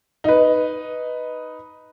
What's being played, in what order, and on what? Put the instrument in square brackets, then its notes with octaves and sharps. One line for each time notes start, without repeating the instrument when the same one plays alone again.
[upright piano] D#4 B4